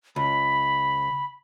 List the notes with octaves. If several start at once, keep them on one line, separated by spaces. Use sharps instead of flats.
C#2 B5